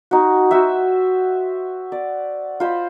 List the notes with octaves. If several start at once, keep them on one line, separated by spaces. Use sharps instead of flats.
D#4 F#4
F#4 C5 E5
D5
F4 C5 D#5 B5